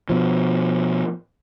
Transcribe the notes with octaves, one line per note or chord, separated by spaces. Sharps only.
B2 F3